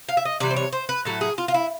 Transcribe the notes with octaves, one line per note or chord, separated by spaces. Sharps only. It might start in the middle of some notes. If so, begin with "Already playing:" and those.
F5
E5
D#5
C3 E3 G3 D5
C5
C#5
C5
B4
A2 F#3 A3 A4
G#4
F4
F4
E4